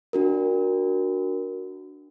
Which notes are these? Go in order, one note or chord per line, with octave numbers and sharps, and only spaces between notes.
D4 F#4 A#4